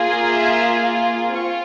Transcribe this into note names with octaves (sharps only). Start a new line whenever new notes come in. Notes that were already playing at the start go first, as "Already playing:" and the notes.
Already playing: A#3 F4 G#4
E5
C4 F4 C#6